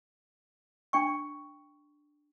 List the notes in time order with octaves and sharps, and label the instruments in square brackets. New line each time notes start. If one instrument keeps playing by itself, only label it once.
[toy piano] D4 G5 C#6